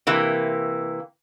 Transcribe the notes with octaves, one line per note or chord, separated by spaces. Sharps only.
C3 E3 A#3